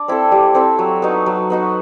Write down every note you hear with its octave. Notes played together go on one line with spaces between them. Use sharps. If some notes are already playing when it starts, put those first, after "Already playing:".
Already playing: D4 D5
C4 E4 A4
G3
C4 E4 A4
F#3
B3 D#4 F#4
F#3
B3 D#4 F#4